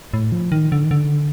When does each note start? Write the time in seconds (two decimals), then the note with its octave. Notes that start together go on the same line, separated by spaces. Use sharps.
0.14 A2
0.32 F3
0.52 D#3
0.72 D3
0.84 D#3
0.91 D3